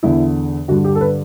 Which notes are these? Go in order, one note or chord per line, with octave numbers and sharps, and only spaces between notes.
E2 D3 E4
G2 D3 F#4
G4
A4
B4